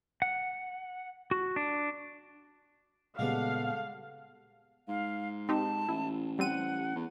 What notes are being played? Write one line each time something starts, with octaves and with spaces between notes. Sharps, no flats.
F#5
F#4
D4
A#2 C#3 G3 G#3 B3 A4 F5 F#5
G#2 F5
C4 D#4 G4 A5
A1 E4
G3 C4 F#5 D#7
E2